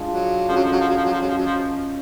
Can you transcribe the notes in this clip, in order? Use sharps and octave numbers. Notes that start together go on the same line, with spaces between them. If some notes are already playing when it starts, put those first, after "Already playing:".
Already playing: G#3 D4 F4 G#4
F#3
D3 F3 G#3 C#4 F4
F#3
F3
F#3
F3
F#3
F3
F#3
F3
F#3 G#3 C#4 F4
F3
F#3
F3